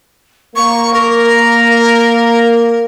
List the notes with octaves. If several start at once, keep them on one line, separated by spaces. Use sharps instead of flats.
A#3 C#6
A#4